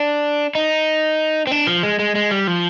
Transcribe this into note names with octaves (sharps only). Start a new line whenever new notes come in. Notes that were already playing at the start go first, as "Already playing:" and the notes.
Already playing: D4
D#4
C4
D4
F3
G#3
G#3
G#3
G3
F3